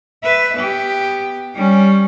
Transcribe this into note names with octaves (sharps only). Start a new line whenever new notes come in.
B4 E5
B3 G4
G3 C#4